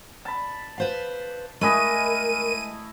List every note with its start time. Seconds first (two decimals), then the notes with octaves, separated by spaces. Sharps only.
0.25 A5 B5
0.78 B4 C5 F5
1.61 G#3 A3 E4 A#4 D#5 G#5 D#7